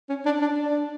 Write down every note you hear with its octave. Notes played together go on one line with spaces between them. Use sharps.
C#4
D4
D4
D4